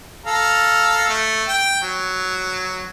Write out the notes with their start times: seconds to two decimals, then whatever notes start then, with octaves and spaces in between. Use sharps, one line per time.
0.26 A4 F5 A#5
1.09 A3
1.48 G5
1.81 F#3